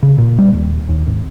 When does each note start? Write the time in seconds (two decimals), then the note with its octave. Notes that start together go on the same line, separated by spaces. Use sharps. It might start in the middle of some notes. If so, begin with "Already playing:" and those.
0.03 C#3
0.18 A#2
0.39 G3
0.53 D#1
0.89 D#2
1.07 G#1